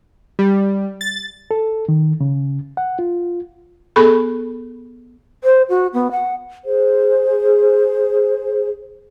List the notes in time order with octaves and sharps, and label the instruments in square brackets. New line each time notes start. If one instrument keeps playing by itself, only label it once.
[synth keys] G3
A6
[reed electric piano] A4
D#3
C#3
F#5
F4
[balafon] B3 G#4 A4 B5 C#6
[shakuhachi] C5
F#4
B3
F#5
[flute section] G#4 C5